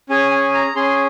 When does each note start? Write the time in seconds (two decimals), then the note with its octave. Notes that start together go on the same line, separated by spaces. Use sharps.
0.09 C#4 G#4 G#5
0.31 G#5
0.54 A#5
0.76 C#4 G#4 C6